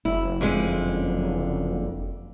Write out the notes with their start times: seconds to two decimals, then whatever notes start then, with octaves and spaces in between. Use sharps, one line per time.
0.05 F#1 E4
0.41 F2 D3 G#3